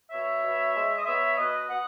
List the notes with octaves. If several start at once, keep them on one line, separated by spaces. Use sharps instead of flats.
B2 C#5 E5
B2
G#3
D#5
B3 C#5 E5
B2 B4 D#5
B2 D#5 F#5